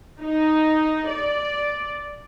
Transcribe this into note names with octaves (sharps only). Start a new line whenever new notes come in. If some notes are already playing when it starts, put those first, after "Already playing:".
D#4
D5